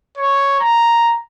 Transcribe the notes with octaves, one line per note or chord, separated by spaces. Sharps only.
C#5
A#5